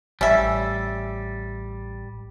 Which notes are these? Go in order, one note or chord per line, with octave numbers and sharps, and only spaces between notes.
A1 G3 C#4 E5